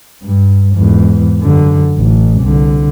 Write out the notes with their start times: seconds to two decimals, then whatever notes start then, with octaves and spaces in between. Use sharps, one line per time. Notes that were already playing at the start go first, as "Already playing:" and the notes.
0.23 G2
0.75 E2 G#2
1.40 F#2 D3
1.98 A1
2.41 C2 D3